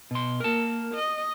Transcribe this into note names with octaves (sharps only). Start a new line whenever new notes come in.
B2 C6
A#3 A#4 A5
D#5